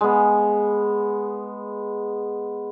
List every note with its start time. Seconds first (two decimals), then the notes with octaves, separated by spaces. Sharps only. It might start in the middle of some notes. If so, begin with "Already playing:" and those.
0.01 G#3 B3